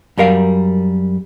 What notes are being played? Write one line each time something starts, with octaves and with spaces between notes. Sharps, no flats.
F#2 G3 A#4 F5